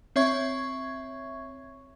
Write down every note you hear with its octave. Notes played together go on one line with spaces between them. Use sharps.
C4 C#5 E5 C#6 G#6